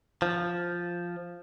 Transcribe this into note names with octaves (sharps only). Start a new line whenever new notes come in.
F3